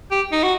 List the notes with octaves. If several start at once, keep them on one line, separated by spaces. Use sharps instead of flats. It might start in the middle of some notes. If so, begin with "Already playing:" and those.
G4
D#4
F#4